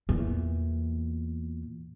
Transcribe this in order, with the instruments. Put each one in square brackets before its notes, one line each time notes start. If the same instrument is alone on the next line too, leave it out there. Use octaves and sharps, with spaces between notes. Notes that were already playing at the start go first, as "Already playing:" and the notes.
[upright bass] E2 A#2